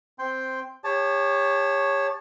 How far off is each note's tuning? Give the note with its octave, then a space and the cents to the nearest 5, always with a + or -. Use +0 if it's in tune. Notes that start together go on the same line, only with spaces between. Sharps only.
C4 +0 G5 +5 C6 +0
G4 +40 C#5 +0 A5 +0